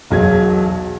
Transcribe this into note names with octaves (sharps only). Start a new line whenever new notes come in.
E1 B1 F#3 G#4 G#6